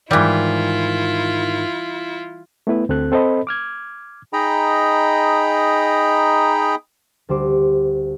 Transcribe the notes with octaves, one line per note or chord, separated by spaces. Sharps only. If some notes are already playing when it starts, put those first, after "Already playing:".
G#2 D#3 E3 G3 E4 F4
A3 B3 E4 B4
D2 C4 A4 F#6
C4 A4 C5 D#5 B5
D6 F6 G#6
D#4 G#4 D#5 G5 A#5 B5
D2 G3 C5 D6